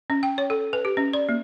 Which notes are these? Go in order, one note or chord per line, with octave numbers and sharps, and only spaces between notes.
C#4
G5
C#5
A4
B4
G4
C#4
D5
A#3